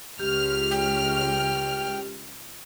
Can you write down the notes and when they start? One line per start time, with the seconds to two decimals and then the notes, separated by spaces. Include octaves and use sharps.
0.20 C#2 G4 F6
0.71 G5